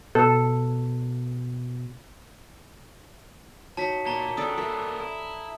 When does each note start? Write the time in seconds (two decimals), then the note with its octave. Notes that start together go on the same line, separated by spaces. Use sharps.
0.15 B2 A4
3.77 F#3 D#4 A5 B6
4.06 A#2 A5 A#5 G7
4.37 C#2 D4 A4 D5 D#6
4.58 A#3 E4 A4
5.00 E4